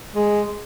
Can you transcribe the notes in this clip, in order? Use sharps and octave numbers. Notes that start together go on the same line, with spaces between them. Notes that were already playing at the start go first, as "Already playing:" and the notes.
G#3